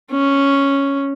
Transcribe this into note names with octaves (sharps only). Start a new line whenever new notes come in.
C#4